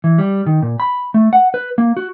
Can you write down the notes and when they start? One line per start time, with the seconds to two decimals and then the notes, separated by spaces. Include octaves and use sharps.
0.04 E3
0.18 G3
0.46 D#3
0.62 A#2
0.80 B5
1.14 A3
1.33 F#5
1.54 B4
1.78 A#3
1.97 F#4